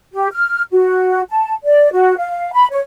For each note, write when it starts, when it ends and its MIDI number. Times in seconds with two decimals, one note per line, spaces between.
0.13 0.28 67
0.33 0.62 89
0.71 1.22 66
1.29 1.52 81
1.65 1.91 74
1.92 2.16 66
2.17 2.52 77
2.53 2.66 83
2.71 2.80 73